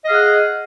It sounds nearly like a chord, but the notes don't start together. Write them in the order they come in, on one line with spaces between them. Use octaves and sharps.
D#5 F5 G#4 F#5